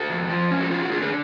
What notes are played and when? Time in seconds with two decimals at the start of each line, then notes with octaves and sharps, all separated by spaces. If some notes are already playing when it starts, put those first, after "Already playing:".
Already playing: F#4 A4
0.10 F2
0.30 F3
0.51 C#4
0.61 F#4 A4
0.71 F4 F#4
0.82 F#4
0.91 D3 F4 G#4
1.03 G#4 B4